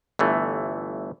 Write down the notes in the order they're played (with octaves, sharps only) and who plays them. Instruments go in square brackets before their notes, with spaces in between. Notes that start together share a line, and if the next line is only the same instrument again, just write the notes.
[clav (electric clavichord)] G1 E3 A3